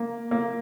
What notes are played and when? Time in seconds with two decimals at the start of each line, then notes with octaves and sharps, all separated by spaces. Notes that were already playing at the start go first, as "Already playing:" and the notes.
Already playing: A#3
0.31 A#3